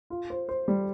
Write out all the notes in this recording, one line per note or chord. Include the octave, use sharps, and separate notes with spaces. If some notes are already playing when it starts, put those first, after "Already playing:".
F4
C5
C5
G3